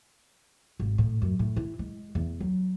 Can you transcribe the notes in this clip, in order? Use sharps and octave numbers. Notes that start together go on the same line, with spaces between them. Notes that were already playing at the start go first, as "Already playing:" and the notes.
G#1
A2
F#2
A2
E4
G#3
E2
F#3